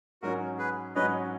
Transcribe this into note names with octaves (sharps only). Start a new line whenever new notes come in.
G#2 F#3 C#4 F#4 A#4
G#4 B4
G#2 F#3 C#4 B4 D#5